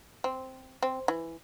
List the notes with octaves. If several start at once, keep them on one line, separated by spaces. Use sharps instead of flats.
C4
C4
E3